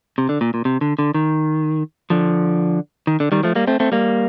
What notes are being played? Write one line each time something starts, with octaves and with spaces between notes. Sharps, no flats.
C3
D3
A#2
A#2
C3
D3
D3
D#3
D3 F3
D#3
D3
D#3 G3
F3 A3
G3 A#3
A3 C4
A3 C4
G3 A#3